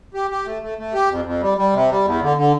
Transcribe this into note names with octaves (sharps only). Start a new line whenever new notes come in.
G4
G4
A3
A3
A3
G4
F2
F2
G3
G3
C3
G3
E2
D3
D3